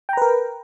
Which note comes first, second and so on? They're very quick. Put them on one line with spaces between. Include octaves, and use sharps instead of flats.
G5 A#5 B4 A#4